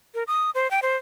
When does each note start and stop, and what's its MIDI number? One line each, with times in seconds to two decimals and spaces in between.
0.15 0.23 70
0.27 0.50 87
0.55 0.70 72
0.71 0.80 79
0.82 0.96 72